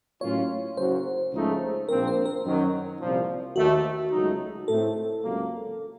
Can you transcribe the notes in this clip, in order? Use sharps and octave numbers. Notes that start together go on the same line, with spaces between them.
A2 F#3 A#3 C#4 F4 C#5
F#1 F#2 C#3 F#3 C5
C#2 C#3 F3 A3 D#4
A#1 A#2 F3 C4 A#4
C5
A#4
F#2 D#3 F#3
C2 A#2 F3
D#2 D#3 A3 F#4
C#2 C#3 F#3 A3 D#4
A2 A3 C4 A4
C#2 C3 F#3 A#3